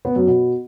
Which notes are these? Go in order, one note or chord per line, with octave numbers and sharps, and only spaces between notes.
B3
F#2
B2